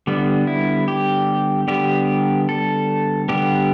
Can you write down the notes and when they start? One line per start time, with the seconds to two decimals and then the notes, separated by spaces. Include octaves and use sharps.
0.07 D3 G3 B3
0.47 E4
0.88 G4
1.68 D3 G3 B3 G4
2.49 A4
3.29 D3 G3 B3 G4